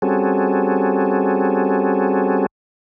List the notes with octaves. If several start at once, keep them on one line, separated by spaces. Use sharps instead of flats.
G3 C4 C#4 F#4 G#4 A4